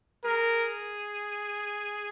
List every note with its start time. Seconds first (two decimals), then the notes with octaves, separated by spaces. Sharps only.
0.24 G#4 A#4